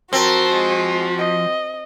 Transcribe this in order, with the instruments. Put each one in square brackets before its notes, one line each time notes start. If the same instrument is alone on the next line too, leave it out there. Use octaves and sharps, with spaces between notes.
[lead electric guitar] F3 [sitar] C4 [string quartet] F#4 [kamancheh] A#4 A5
[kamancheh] G#3
D#5